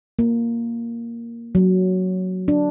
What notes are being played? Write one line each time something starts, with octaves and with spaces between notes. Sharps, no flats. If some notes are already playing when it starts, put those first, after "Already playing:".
A#3
F#3
D4